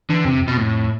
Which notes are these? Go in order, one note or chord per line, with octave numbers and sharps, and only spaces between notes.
D3 E3
F2 C3
F2
B2
A2